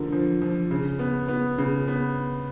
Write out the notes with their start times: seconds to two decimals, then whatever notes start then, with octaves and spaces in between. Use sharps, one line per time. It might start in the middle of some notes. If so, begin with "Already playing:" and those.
Already playing: D3 F3 A#3
0.12 F3
0.42 F3
0.71 C#3
0.99 B3
1.28 B3
1.58 C#3
1.88 B3